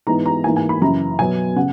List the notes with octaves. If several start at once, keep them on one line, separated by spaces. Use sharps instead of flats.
G#2 E3 G#3 B3 A#5
A#5
G#2 E3 A#3 G#5
G#5
B5
F#2 C#3 E3 A#5
B2 F#3 B3 G#5
C#3 F#5